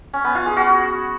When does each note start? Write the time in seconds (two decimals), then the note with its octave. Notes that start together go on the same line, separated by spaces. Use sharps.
0.13 C#4
0.24 B3
0.35 F4
0.46 G#4
0.57 F#4